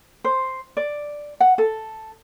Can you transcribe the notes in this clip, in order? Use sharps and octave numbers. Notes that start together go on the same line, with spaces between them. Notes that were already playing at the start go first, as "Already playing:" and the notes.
C5
D5
F#5
A4